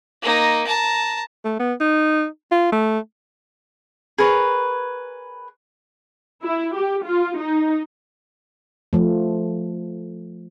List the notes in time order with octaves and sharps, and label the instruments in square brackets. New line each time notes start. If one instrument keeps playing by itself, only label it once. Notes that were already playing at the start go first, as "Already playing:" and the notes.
[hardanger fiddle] A#3 D#4
A5 A#5
[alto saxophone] A3
B3
D#4
F4
A3
[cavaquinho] G#4 A#4 B4 C#5
[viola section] E4
G4
F4
D#4
[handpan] F3 A3